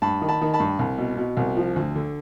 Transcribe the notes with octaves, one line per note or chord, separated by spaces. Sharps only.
G2 A5 B5
D#3
A5 B5
D#3
A5 B5
G2
C2
B2
B2
C2
F3
D2
D3